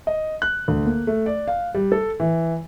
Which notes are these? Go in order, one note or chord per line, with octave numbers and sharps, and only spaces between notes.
D#5
F#6
D2
A#3
A3
D5
F5
G3
A4
E3